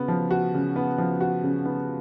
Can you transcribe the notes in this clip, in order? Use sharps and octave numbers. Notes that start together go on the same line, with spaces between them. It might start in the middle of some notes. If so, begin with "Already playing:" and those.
Already playing: C#3 B3 F#4
F3
F#4
C#3
B3
F3
F#4
C#3
B3